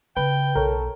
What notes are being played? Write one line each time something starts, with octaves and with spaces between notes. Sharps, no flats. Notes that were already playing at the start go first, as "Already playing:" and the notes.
C#3 B4 G5
B1 A4 A#4 C#5